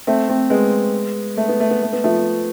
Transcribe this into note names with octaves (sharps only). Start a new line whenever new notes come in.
A3 C4
A3 C4
G#3 B3
A3
B3
A3
B3
A3
B3
F3 A3